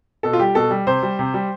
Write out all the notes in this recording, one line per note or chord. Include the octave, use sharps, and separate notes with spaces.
B2 A4
F4
G3 G4
B2 A4
G3
C3 C5
G3
C3
G3